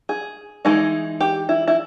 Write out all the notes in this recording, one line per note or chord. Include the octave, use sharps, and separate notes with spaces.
G#4
E3 G#3 D#4
G4
E4
E4